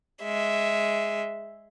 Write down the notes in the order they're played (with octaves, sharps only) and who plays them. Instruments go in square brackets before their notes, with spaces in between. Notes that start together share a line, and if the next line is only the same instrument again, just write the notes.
[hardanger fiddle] G#3 E5